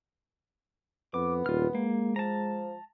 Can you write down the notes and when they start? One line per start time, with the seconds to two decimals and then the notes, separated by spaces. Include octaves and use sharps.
1.14 F2 B3 D6
1.46 D#1 F4 F6
1.75 G#3 A#3
2.16 F3 A5 A#5